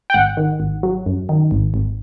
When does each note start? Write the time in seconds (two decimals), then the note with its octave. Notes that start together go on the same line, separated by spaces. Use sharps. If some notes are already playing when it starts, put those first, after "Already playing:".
0.10 G5
0.14 G#1 F#5
0.37 D#3
0.60 G#1
0.83 F#3
1.06 F#2
1.29 D#3
1.51 G#1
1.74 G#1